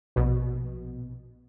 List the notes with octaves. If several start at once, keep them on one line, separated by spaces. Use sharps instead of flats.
A#1 B2